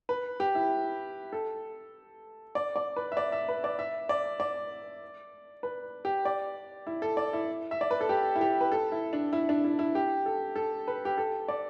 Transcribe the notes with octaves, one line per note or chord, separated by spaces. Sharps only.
B4
G4
E4
A4
D5
D5
B4
E5
D5
E5
B4
D5
E5
D5
D5
B4
G4
D5
E4
A4
D5
E4
E5
D5
B4
A4
G4
E4
G4
B4
A4
E4
D4
E4
D4
E4
E4
G4
A4
A4
B4
G4
A4
D5